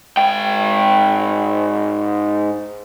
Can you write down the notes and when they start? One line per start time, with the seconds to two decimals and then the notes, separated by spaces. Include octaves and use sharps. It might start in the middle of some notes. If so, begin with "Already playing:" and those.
0.17 G#2 G5